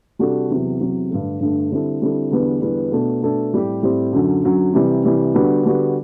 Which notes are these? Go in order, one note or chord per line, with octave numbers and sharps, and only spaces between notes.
C3 G3 D4 F#4 A4
E2 C3 F#3
E2 C3 F#3
G2 D3 A3
G2 D3 A3
D3 G3 C4 E4 A4
D3 G3 C4 E4 A4
E2 D3 G3 B3
E2 D3 G3 B3
B2 A3 D4 A4
B2 A3 D4 A4
A2 G3 C4 G4
A2 G3 C4 G4
F#2 D3 F#3
F#2 D3 F#3
C3 E3 G3
C3 E3 G3
D3 G3 B3 F#4
D3 G3 B3 F#4